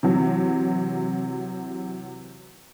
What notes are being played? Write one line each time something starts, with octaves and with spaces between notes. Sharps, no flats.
C3 E3 F#3